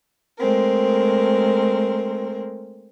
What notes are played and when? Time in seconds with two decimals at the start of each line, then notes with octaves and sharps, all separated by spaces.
0.38 G#3 A3 C4 A#4